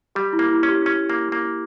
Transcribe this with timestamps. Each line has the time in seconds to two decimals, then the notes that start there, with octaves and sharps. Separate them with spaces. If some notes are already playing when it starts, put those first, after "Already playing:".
0.15 G3 G4
0.33 E4
0.39 A#3
0.50 E4
0.63 C#4
0.69 G4
0.86 C#4
1.10 A#3
1.32 A#3